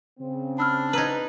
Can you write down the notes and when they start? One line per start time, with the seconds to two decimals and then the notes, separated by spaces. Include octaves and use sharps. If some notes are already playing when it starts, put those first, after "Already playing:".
0.19 C#3 C4
0.58 D4 B5 E6 F6
0.93 D#4 B4 A#5 E6 G#6